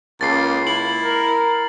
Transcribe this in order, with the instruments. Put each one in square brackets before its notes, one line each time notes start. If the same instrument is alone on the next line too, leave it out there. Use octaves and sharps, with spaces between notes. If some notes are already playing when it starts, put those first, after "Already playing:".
[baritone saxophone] C#2 [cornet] A#3 [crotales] A6 C7
[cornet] A#3 [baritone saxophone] E4 [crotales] F#7
[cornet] A#4